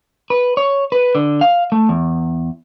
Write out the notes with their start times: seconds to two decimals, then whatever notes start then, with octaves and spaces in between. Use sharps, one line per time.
0.30 B4
0.57 C#5
0.92 B4
1.15 D3
1.41 F5
1.72 A3
1.89 E2